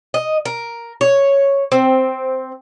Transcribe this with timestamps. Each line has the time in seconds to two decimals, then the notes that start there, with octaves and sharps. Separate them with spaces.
0.14 D#5
0.45 A#4
1.01 C#5
1.72 C4